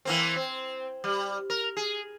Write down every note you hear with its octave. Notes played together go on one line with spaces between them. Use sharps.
E3 A#3 C4
C4
G3
A#4
G#4